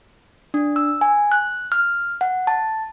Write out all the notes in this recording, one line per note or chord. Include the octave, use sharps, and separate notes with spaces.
D4
E6
G#5
F#6
F6
F#5
A5